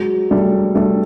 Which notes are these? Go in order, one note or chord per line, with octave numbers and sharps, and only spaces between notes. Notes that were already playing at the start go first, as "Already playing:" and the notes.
Already playing: F#3 G#3
G3 A3
G3 A3